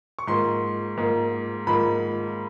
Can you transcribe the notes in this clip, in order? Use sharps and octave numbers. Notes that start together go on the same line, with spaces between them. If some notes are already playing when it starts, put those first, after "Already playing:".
C#6
G#2 F3 A#3 C6
G#2 F3 A#3
G#2 F3 A#3 B5